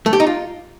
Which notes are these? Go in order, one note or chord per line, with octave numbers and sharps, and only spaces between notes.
A3
G4
D#4
F4